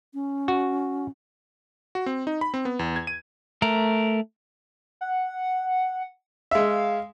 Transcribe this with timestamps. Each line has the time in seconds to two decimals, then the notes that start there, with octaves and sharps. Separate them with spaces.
0.14 C#4
0.48 F#4
1.95 F#4
2.06 C4
2.27 D#4
2.41 B5
2.54 C4
2.65 B3
2.79 E2
2.96 G#6
3.07 D#7
3.62 A3 A#4
5.01 F#5
6.51 G#3 E5 F5